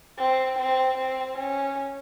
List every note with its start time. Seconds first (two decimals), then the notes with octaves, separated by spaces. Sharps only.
0.18 C4
0.59 C4
0.98 C4
1.37 C#4